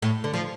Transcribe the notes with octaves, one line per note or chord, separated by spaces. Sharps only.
A2
D3
F3